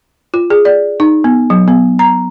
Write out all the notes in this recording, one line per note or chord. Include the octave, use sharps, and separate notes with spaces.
F4
G#4
D5
D#4
B3
F#3
B3
A#5